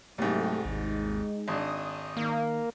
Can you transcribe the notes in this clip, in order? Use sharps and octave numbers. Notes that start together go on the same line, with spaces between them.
C2 G#2 F#3 A3 A#3 G4
G#1 D#2 G#3 D#4
G#1 D4 D#6
D#3 A#3